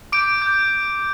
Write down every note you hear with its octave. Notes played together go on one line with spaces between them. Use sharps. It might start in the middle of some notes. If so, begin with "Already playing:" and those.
D6 G6 D7
D6 G6